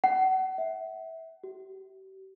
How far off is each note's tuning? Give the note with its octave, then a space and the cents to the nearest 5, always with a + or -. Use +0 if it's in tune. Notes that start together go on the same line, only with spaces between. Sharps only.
F#5 +30
E5 -20
G4 -40